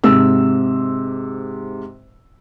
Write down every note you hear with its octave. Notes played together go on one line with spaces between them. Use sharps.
G#2 C3 E6